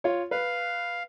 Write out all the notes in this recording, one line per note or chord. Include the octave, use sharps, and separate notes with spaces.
F4 C#5
B4 F5